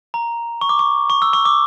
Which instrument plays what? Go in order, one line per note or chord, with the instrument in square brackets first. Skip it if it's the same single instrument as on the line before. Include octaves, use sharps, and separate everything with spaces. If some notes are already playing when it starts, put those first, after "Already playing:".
[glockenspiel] A#5
C#6
D6
C#6
C#6
E6
C#6
D6